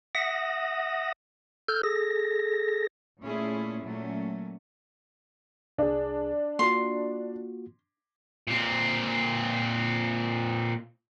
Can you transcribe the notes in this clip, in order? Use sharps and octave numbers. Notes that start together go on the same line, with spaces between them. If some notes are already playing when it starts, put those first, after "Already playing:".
E5 F#5 D#6 A#6
A4 F6 G6
G#4 A4 A#6
A#2 A3 C#4 E4 G#4
A#2 F#3 A3 C#4
C2 D4 G#4
A#3 F4 F#4 C6
A#2 C4